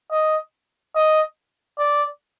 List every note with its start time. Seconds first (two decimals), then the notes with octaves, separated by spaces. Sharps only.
0.11 D#5
0.96 D#5
1.79 D5